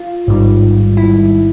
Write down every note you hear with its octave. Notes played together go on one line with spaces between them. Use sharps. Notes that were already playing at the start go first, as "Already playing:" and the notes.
Already playing: F4
A1 G#2 D#3 G3
E4